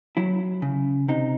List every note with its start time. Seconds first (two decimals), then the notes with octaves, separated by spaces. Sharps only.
0.17 F#3 E4
0.62 C#3
1.08 C3 D#4